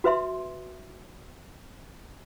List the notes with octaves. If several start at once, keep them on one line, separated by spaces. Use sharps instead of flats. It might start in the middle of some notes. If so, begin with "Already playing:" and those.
F#4 B4 E5 C6